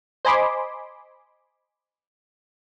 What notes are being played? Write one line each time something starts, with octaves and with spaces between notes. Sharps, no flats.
C5 D#5 G#5 B5 C6 D6